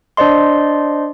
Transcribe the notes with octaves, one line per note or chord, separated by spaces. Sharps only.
D4 C5 D5 D#5 C6